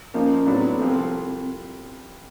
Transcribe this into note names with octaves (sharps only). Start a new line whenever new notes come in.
A#2 F3 A#3 C#4 D#4
A2 F#3 B3 C4 D4 F#4
B3
C4
C2 C3 F3 A3